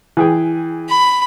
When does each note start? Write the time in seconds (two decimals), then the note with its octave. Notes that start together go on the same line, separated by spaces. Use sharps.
0.17 E3 G#4 G5
0.89 B5